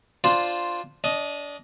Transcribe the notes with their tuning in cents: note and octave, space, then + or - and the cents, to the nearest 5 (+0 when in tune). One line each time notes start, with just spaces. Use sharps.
D4 +0 F4 +0 C5 +0
D4 -25 D#5 +0